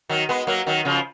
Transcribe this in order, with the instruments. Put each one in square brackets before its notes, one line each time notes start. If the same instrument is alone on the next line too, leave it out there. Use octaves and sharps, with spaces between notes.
[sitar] D#3 F#3
G#3 B3
F#3 A#3
D#3 F#3
C#3 F3